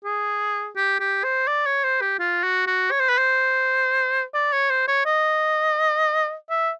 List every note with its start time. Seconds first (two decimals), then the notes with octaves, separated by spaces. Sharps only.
0.04 G#4
0.76 G4
1.00 G4
1.24 C5
1.47 D5
1.66 C#5
1.84 C5
2.01 G4
2.19 F4
2.43 F#4
2.67 F#4
2.91 C#5
3.00 C5
3.09 B4
3.18 C5
4.34 D5
4.53 C#5
4.70 C5
4.88 C#5
5.05 D#5
6.49 E5